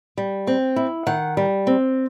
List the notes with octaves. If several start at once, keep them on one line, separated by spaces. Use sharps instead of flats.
G3
C4
E4
D#3 F#5
G3
C4